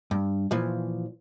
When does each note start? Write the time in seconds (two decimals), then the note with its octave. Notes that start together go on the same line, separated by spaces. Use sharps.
0.11 G2
0.51 A#2 E3 F3